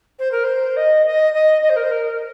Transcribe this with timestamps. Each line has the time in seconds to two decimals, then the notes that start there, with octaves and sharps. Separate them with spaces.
0.19 C5
0.31 A#4
0.44 C5
0.76 D#5
1.06 D#5
1.34 D#5
1.62 D#5
1.69 C5
1.76 A#4
1.83 C5
1.91 A#4